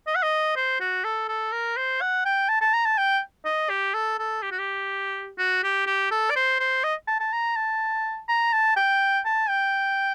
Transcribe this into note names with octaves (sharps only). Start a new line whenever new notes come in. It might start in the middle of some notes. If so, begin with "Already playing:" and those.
D#5
F#5
D#5
C5
F#4
A4
A4
A#4
C5
F#5
G5
A5
A5
A#5
A5
G5
D#5
G4
A4
A4
G4
F#4
G4
F#4
G4
G4
A4
D5
C5
C5
D#5
A5
A5
A#5
A5
A#5
A5
G5
A5
G5